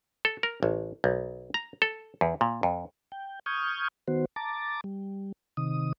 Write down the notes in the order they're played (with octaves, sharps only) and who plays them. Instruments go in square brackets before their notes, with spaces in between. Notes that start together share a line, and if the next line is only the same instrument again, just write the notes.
[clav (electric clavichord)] A4
A#4
A1
B1
A#5
A4
E2
A#2
F2
[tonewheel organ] G5
C#6 D#6 F6 G6 G#6
D#3 B3 F#4 C5
A5 A#5 D6 A6
G3
C3 D#3 D#6